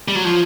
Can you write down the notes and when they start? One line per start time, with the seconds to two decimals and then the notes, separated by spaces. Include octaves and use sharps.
0.08 G3
0.15 F#3
0.25 F3